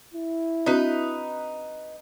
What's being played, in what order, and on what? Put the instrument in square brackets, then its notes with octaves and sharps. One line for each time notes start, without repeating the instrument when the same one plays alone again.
[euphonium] E4
[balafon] C4 D4 F#4 [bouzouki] D#4 B4